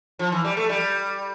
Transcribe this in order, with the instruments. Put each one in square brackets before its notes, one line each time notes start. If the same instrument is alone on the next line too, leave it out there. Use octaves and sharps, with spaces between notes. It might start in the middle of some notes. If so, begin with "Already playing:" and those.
[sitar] F3
E3
G3
A3
G3